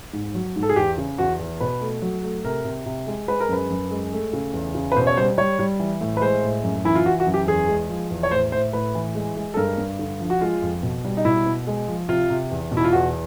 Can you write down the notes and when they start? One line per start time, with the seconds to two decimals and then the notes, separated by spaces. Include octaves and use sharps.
0.13 G#2
0.35 F#3
0.56 G#2
0.63 A4
0.69 G#4
0.76 E2 G4
0.98 C#3
1.18 E2 F#4
1.39 E2
1.60 B2 B4
1.81 A3
2.02 F#3
2.23 A3
2.45 C3 A#4
2.65 C3
2.86 C3
3.07 G#3
3.28 G#3 B4
3.40 A#4
3.49 F#2 B4
3.70 F#2
3.91 G#3
4.12 A3
4.33 C#3
4.53 E2
4.75 C#3
4.92 B4
4.96 B2 C5
5.07 C#5
5.17 G3 C5
5.38 G3 C#5
5.59 G3
5.80 E3
6.01 A2
6.17 B4
6.21 G#3 C5
6.43 A2
6.63 F#2
6.85 E3 E4
6.95 F4
7.06 E3 F#4
7.20 F#4
7.26 F#2
7.34 G4
7.47 E2 G#4
7.68 G#3
7.89 F3
8.10 E2
8.23 C#5
8.31 A2 C5
8.52 A2 C5
8.73 A2 B4
8.95 E3
9.15 G#3
9.37 G#3
9.54 A4
9.57 G2 A#4
9.78 G2
9.99 D3
10.20 F3
10.30 F#4
10.41 G#3 F4
10.62 F2
10.83 B2
11.05 G3
11.17 D#4
11.25 B2 E4
11.46 B2
11.67 G#3
11.88 F3
12.09 C3 F4
12.30 C3
12.51 E2
12.71 B2
12.77 E4
12.84 F4
12.93 E2 F#4